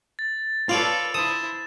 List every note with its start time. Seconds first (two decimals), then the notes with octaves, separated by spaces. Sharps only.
0.19 A6
0.69 F4 A4 B4 C#5 D5 F5
1.14 E4 C5 D#6 E7